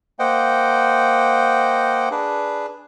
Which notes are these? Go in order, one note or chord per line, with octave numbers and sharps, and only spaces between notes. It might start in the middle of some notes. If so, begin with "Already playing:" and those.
A#3 C5 D#5 F#5 G5
D4 G#4 B4